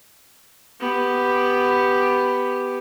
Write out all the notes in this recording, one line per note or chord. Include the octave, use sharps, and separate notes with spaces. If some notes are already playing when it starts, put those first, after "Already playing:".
B3 G4